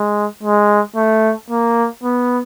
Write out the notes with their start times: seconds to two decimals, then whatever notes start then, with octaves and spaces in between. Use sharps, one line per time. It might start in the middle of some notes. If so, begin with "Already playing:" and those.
Already playing: G#3
0.43 G#3
0.96 A3
1.50 A#3
2.03 B3